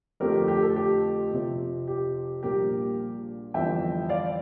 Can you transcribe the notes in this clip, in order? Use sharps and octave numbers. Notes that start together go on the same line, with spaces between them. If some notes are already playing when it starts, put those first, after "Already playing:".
F2 D3 F3 A3 C4 G4 A#4
G4
G4
A4
G4
F2 C3 F3 C4
G4
A#1 A#2 G3 G4 A#4
G1 F2 E3 G3 C4 E5 G5
D5 F5